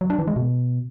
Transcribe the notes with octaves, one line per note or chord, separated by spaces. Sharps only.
F#3
D4
E3
G#3
B2